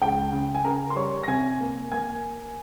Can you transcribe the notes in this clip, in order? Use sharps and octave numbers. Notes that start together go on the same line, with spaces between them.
C#2 G5
C#3
G#5
C#3 A#4 A#5
C6
G3 C#5 C#6
A#6
C3 G#5 G#6
A#3
A#3 G#5 G#6